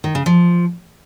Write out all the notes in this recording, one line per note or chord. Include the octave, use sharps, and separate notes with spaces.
D#3
C#3
F3